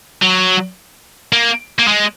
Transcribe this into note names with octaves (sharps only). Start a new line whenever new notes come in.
F#3
A#3
A#3
G#3